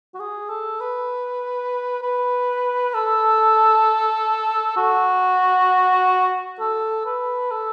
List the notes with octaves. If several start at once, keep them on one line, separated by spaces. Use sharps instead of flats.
F#4
G#4
A4
B4
B4
A4
F#4
A4
B4
A4